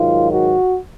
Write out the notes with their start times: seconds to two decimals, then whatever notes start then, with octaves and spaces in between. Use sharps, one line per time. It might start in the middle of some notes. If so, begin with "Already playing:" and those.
Already playing: G#2 D#3 F#3 F4
0.31 F#4